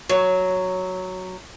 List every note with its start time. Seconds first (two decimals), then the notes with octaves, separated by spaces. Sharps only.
0.09 F#3